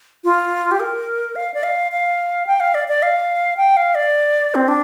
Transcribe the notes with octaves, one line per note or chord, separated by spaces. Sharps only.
F4
G4
A#4
F5
D5
F5
F5
G5
F5
D5
D5
F5
G5
F5
D5
C4
D4